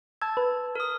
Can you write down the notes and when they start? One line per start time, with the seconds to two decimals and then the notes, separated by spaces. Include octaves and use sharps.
0.22 A5 E6 G#6
0.37 B4
0.75 A#4 D#6